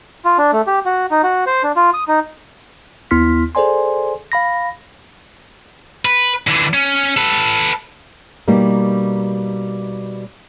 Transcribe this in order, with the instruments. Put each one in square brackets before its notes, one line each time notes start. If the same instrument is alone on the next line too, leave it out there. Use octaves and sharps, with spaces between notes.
[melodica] F4
D4
A3
G4
F#4
D#4
F#4
C5
D4
F4
D#6
D#4
[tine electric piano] D#2 B3 E4 C6 F6 B6
G#4 A4 C5 D5 G#5 C6
F5 B5 A#6
[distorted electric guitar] B4
D3 E3
C#4
A4 B4
[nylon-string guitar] B2 G3 A#3 D#4